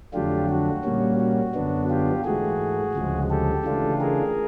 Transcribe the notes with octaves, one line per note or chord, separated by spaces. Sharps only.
F2 D3 F#3 A3 D4 F4 G4
F#4
A#2 G3 A#3 C#4
F#4
F#2 D3 F#3 B3 D4
F4 G4
G#2 E3 A3 F#4 G#4
D2 C#3 F3 G#3
G4 A4
C#3 E3 A3 D4 F4
G#4 A#4